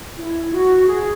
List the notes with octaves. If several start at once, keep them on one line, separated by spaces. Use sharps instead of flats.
E4
F#4
G#4